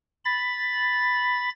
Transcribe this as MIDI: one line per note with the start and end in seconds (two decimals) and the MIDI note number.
0.25 1.49 83
0.25 1.49 93